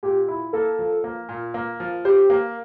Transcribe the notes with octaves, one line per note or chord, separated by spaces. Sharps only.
A#2 G4
E4
A#3 A4
F3
A#3
A#2
A#3
F3
G4 C5
A#3